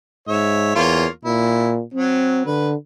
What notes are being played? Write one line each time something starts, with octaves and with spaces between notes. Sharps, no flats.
G#2 C#5 E5
E2 A#3 F4 C#5
A#2 E4
F#3 C4
D3 B4